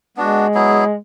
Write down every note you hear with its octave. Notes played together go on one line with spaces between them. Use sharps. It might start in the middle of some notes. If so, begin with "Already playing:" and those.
G#3 B3 D4 F#4
F#3 B3 E4 G#4